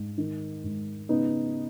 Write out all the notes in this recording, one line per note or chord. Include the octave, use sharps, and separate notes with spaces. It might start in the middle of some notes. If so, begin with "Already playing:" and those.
Already playing: G#2
D#3
G#2
C#3 B3 D#4